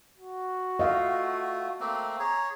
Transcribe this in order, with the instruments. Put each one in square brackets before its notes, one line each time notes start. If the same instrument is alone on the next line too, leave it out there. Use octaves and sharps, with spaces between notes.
[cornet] F#4
[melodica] A3 F4 [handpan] D#5 F5
[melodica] A3 A#3 C4
[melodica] G#4 C#5 [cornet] A#5